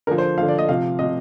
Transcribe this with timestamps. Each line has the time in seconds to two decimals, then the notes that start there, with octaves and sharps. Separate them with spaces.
0.07 D3 F3 A#4
0.18 C5
0.38 D3 F3 F5
0.48 D5
0.59 D#5
0.69 C3 F3 F5
0.99 C3 D#5
1.04 F3